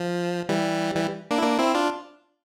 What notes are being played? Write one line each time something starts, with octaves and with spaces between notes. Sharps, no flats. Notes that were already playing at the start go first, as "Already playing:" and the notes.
Already playing: F3
E3 G3
E3 G3
A#3 D4
E4
A#3 D4
C4 E4
D4 F4